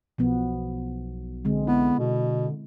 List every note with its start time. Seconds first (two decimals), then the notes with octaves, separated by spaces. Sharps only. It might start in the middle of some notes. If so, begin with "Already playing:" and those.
0.18 B1 B2 F3 B3
1.45 D3 G#3 C4
1.67 B3 E4
1.99 B2 D3